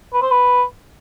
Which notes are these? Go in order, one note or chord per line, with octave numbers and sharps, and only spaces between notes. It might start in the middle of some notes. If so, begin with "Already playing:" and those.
B4
C5
B4